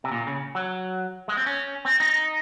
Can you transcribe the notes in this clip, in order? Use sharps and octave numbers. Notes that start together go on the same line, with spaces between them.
C3
A#2
C#3
F#3
G#3
C4
C#4
C4
D#4